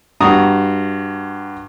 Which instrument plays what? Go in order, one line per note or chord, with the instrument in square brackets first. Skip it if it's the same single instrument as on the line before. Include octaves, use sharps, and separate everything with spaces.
[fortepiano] G2 F#4 A#5 D#6